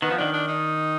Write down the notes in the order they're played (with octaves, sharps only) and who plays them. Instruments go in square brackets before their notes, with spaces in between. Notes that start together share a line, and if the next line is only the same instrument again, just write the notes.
[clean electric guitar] D#3 [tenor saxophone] B3
[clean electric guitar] F3
[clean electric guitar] D#3 [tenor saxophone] D4
[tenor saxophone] D4
D#4